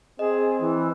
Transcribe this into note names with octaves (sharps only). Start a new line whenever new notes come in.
C4 G#4 D#5
E3